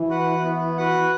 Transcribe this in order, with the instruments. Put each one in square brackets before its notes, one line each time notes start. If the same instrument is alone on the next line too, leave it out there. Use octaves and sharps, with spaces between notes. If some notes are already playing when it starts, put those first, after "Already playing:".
Already playing: [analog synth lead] E3
[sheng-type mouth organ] F#4 B4 F#5
B3
F#4 B4 F#5